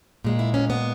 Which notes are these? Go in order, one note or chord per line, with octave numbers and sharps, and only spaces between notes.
A#2 G#3
E4
C#4
B3